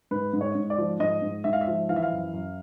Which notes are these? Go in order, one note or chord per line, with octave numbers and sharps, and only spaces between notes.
G#2 B4
G#2
C#5
G#2
D5
F3
G#2 D#5
G#2
G#2 E5
F5
E5
F3
E3 F5
E5
F5
F#2
F#2